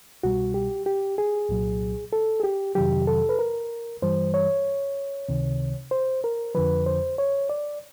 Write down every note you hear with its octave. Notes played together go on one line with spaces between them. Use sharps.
C2 B2 G3 F#4
G4
G4
G#4
C2 A#2 F#3
A4
G#4
G4
F2 C3 D#3 F#3 G4
A4
B4
A#4
G2 E3 G3 C5
C#5
C#2 C3 D#3
C5
A#4
F2 D3 F3 B4
C5
C#5
D5